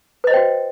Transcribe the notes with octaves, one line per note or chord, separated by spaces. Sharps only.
F#4 B4 C5 D#5 G5